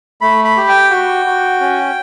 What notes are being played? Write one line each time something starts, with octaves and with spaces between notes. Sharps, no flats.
A3 B5
B5
G4
G5
F#4
F#4
C#4